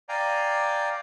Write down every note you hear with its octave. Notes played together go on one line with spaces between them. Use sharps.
D5 F5 G5 G#5 A#5